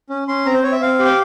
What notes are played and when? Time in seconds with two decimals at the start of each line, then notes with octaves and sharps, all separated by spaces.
0.10 C#4
0.28 C#4 C6
0.46 C4 A#5
0.54 C5
0.63 C4 C#5
0.72 E5
0.81 C4 F5
0.99 G4
1.05 G5